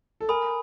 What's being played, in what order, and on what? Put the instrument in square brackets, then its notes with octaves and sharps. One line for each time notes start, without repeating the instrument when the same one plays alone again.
[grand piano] A4
[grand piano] A#4 [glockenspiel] G#5 B5 D#6